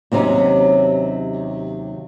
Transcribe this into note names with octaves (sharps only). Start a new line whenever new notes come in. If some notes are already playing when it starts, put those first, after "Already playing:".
D#2 C3 F#3 B3 C#4 D#4